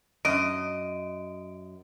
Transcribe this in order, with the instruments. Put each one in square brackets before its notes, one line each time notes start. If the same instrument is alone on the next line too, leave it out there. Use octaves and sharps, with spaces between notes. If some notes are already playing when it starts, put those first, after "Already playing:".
[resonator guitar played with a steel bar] F#2 [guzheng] D#5 [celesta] D7